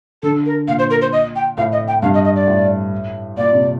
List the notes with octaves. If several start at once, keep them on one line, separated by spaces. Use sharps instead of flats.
D3 A4
A#4
A#2 F5
C5
A#4
C5
D#5
G5
A2 F5
D#5
G5
G2 F5
D#5
D#5
D5
A2
A#2 D5
C3